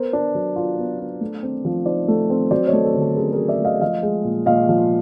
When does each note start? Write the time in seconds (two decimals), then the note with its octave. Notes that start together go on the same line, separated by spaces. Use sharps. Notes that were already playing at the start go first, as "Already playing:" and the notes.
Already playing: B3 A#4 C5
0.13 D4
0.35 F#3
0.56 F4
0.78 B3
0.99 D4
1.21 A3
1.43 C4
1.65 F3
1.86 D#4 C5 D5
2.08 A3
2.30 C4
2.51 F#3 C5 D5
2.68 C#5 D#5
2.73 A3
2.84 A4
2.94 D3
3.01 A4
3.16 C#4 G#4 A#4
3.33 F#3 G#4 A#4
3.48 D5 E5
3.60 A3 D#5 F5
3.81 F3 D#5 F5
4.03 G#3
4.24 A#2
4.46 A#2 D#5 F5
4.69 F3